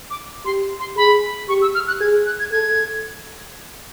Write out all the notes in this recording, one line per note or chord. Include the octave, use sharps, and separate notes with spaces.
D6
G4 C6
C6
G#4 B5
G4 C#6
E6
F6
F#6
G#4 G#6
F#6
G#6
A4 G#6